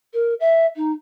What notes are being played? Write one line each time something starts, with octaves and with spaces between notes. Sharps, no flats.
A#4
E5
D#4